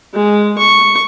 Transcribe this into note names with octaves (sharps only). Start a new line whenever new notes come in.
G#3
C#6